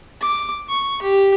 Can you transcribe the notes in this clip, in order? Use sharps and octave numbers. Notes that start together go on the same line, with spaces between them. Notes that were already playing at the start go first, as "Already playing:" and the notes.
D6
C#6
G4